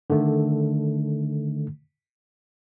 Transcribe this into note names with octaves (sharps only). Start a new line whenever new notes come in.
D3 D#3 A3